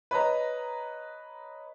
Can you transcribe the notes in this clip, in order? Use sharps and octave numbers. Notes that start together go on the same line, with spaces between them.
B4 C#5 D#5 A#5